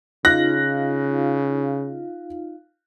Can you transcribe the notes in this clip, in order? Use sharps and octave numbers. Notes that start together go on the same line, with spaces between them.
C#3 D#4 F4 F5 F#6 A#6